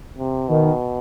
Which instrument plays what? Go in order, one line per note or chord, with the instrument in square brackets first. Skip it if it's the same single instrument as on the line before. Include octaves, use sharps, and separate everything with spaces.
[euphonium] C3
[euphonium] B2 [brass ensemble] D#3